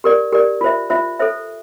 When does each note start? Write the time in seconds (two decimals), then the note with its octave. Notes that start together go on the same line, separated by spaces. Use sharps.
0.04 G4 A#4 D5
0.32 G4 A#4 D5
0.61 F4 C5 E5
0.90 F4 C5 E5
1.19 A4 C5 E5